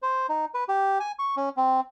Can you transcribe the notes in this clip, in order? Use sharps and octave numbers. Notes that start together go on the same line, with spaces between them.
C5
D#4
B4
G4
G#5
C#6
C#4
C4